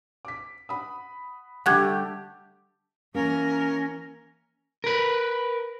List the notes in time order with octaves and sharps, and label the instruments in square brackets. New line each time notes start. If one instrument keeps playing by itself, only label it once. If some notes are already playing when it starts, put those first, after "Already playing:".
[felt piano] D6 B6
F#5 B5 D#6
[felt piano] D3 G3 [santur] A3 G4 [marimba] F#5 F#6 G#6
[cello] E3 A#4 [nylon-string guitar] A#3 [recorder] C#4
[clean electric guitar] A#4 B4